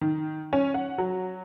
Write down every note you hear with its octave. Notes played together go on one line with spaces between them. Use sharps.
D#3
C#4
F#5
F#3